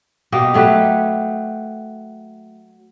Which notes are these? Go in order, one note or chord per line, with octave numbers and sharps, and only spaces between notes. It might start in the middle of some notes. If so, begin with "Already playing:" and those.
B2 A#3 G4 D#5
F#3 A3 G4 B4